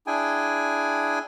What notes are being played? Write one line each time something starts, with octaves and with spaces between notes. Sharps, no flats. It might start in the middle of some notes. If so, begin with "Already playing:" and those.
D4 E4 G#4 G5 G#5